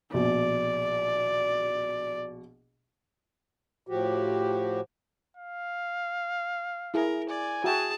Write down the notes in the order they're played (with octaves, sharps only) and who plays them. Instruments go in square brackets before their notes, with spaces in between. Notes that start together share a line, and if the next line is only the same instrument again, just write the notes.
[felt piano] A#1 B2 [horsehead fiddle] D5
[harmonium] A2 F3 F#4 G4
[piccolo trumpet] F5
[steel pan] E4 G#4 [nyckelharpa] A#4
[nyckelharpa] D5 [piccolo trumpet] G#5
[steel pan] F#4 E5 G5 [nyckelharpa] G#4 A5